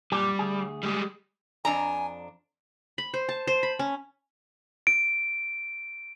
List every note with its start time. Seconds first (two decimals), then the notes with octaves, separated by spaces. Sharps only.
0.12 F#2 A#2 G3 G4
0.39 D2 G#4
0.83 G3 G#3
1.65 F2 D4 G#5 A#5
2.98 B5
3.14 C5
3.29 A5
3.47 C5
3.63 B5
3.79 C#4
4.87 D7